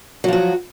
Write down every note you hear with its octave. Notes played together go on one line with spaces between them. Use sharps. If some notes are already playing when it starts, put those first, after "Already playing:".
F3 F#3 F#4